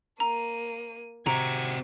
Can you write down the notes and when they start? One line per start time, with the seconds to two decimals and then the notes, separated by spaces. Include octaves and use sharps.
0.20 A#3 A#5 D#7
1.26 C3 C4 F#4 A#5 G#6